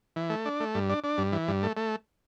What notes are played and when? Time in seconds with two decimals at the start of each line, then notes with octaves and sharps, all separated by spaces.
0.16 E3
0.30 A3
0.45 D4
0.60 A3
0.75 G2
0.89 D4
1.04 D4
1.18 G2
1.32 E3
1.48 G2
1.63 A3
1.77 A3